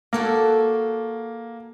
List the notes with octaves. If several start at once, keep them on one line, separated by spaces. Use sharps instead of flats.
A#3 F#4 A4 D5